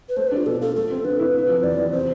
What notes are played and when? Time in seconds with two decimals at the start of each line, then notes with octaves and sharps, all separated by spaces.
0.09 B4
0.17 A3 C5
0.27 D4 B4
0.37 F4
0.46 B2 A4
0.61 F4 A4
0.76 A3 A4
0.91 C4
1.05 D3 B4
1.20 E4
1.34 C3
1.49 F3
1.63 E2 D5
1.78 E2
1.92 C3 C5